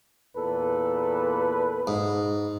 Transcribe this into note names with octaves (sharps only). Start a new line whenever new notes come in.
E2 A#2 A4 B4
G#2